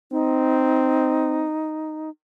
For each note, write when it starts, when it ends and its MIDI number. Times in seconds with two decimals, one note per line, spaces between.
0.12 1.46 60
0.12 2.10 63